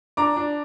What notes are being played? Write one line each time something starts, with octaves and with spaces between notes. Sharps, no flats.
D4 A#5 D6
D4